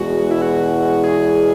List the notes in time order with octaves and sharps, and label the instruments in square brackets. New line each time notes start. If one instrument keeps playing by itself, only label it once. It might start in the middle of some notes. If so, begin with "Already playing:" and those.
Already playing: [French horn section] E2 B2 G#3 [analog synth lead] F#4
[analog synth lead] E4
F#4
G#4